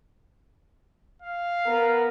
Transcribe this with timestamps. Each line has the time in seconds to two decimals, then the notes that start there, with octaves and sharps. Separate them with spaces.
1.22 F5
1.67 B3 A#4